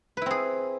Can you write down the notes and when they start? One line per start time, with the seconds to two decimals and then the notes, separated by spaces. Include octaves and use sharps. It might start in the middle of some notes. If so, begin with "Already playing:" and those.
0.17 B4
0.22 E4
0.26 C4
0.31 G#4